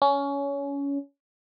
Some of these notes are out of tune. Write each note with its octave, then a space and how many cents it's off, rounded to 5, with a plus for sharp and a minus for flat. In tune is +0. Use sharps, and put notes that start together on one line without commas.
C#4 +20